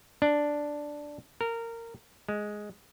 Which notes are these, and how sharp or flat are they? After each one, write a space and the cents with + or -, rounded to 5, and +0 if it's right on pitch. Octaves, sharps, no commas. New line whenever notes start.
D4 +0
A#4 -20
G#3 +5